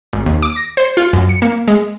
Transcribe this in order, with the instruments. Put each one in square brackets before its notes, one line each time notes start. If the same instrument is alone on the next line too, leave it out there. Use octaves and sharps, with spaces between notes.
[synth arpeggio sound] G#1
D#2
D6
A#6
C5
F4
F#2
C#7
A#3
G#3